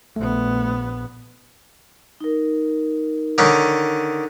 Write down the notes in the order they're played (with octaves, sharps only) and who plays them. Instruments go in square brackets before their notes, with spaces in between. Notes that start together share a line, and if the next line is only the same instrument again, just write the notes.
[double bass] A#1 B3 [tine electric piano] A3
[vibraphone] D#4 A#4
[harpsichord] D3 D#3 C#4